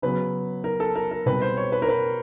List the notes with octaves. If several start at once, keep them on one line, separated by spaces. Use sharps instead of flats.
C#3 F#3 B3 B4
A#4
A4
A#4
A#4
B2 G3 C4 B4
C5
C#5
B4
A#4
B4